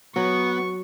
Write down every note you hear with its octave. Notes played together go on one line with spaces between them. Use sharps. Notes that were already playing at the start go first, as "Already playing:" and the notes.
F#3 B3 C#6